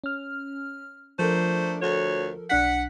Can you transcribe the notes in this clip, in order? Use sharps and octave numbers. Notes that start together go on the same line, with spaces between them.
C#4 F6
F3 A3 D4 A4 A#4 C5
D2 F#4 C#5
B1 D4 F#5 B6